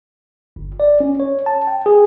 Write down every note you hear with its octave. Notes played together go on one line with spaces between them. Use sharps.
G1
D5
C#4
C#5
A5
G5
G#4